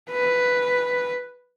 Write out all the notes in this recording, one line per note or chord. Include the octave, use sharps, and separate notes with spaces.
B4